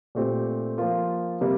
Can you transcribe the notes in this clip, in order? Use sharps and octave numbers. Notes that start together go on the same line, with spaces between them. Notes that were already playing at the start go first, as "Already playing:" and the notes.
A#2 A3 C4 G4
F3 A#3 F4
C3 G3 A#3